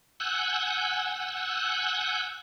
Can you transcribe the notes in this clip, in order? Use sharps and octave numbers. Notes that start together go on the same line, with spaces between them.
F#5 G#5 E6 F#6 G6